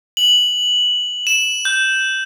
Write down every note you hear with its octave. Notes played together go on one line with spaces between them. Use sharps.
F#7
E7
G6